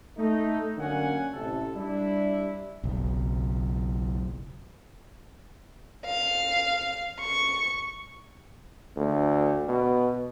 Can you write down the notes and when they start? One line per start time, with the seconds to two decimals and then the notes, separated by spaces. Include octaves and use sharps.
0.18 A3 D#4
0.77 F#2 D3 A#3 C#4 F#5 G#5
1.34 A1 C3 A4
1.75 G3 D4 E4
2.84 F#1 B1
6.06 F5
7.20 C#6
8.97 D2
9.68 B2